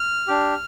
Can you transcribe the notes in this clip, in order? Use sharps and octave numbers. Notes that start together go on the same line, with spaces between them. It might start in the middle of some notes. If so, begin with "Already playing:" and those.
Already playing: F6
D4 G4